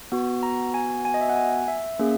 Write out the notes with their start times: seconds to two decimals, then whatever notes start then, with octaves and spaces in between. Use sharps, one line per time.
0.12 B3 F#4
0.43 A#5
0.74 G#5
1.05 G#5
1.14 D#5
1.21 E5
1.29 F#5
1.36 G#5
1.68 E5
1.99 A#3 C#4 G#4